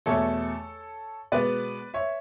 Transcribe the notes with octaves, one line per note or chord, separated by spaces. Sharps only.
E2 B2 A3 A4 C#5
B2 G#3 B3 B4 D5
C#5 E5